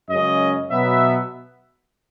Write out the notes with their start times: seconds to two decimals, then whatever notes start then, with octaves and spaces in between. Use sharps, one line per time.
0.09 F#2 C#3 G#3 C#4 D#5
0.71 B2 F#3 B3 E5